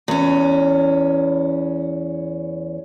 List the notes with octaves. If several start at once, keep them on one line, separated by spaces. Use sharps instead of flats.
E2 C#4